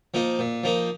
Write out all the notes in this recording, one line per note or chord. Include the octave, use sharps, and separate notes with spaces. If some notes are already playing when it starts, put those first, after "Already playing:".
F3 A#3 D#4
A#2
F3 A#3 D#4